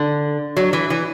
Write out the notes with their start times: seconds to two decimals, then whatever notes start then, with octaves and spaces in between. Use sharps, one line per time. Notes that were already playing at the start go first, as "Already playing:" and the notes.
Already playing: D3
0.57 F#3
0.73 E3
0.90 E3